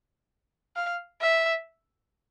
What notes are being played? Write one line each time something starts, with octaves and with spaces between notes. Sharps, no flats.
F5
E5